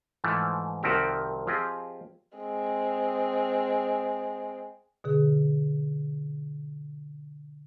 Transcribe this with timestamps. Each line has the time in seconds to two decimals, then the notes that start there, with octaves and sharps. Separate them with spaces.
0.24 G#2 E3 F3 A3
0.83 C2 D#3 F3 C4 F#4 G4
1.47 F3 C4 F4 G4 G#4 D#5
2.38 G#3 C4
5.04 B2 D3 G#4